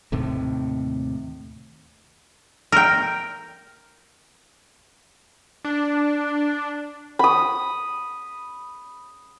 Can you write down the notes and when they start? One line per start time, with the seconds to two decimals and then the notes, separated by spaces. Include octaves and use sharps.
0.12 D#2 A2 C3
2.72 A#4 G5
5.65 D4
7.19 B5 D#6